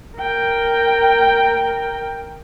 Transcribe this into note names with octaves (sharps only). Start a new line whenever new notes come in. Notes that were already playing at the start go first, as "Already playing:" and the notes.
A#4 G5